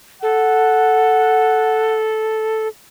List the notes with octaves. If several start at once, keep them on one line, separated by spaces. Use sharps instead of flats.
A4 F#5